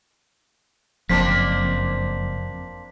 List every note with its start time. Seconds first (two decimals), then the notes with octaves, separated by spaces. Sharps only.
1.09 F#1 F2 A#3 C4 D4 B6